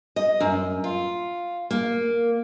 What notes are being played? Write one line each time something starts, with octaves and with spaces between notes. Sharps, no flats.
D#5
F#2
F4
A#3